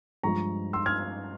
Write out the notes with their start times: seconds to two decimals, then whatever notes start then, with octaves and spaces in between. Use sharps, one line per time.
0.23 G2 F3 G#3 A#5 C#6
0.73 C6 E6
0.86 F6 G#6